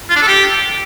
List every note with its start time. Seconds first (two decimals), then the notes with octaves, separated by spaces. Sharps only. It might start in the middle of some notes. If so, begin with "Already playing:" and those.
0.10 F4
0.16 D4
0.22 A4
0.28 G4